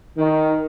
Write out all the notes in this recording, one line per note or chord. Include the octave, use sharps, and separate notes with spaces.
D#3